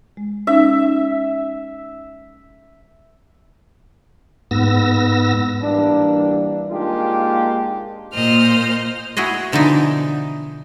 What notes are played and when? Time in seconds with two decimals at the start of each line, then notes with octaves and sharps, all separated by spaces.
0.17 G#3
0.47 C#4 D#4 E5 E6
4.51 G#2 B3 E6 A#6
5.62 E3 G3 A#3 D4
6.70 G#3 A#3 D4 D#4 F4 G4
8.13 A#2 C5 D#5 F6
9.17 E4 F#4 G#4 D#5
9.52 B2 D3 E3 F3 D#4